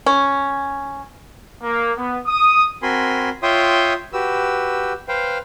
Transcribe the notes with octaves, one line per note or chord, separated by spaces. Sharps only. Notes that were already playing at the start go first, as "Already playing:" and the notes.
C#4
A#3
B3
D#6
C4 F#4 A#4 G#5 B5 C6
F4 C#5 E5 G5 C6 D#6
F#4 G4 B4 E6
B4 C5 F5 G5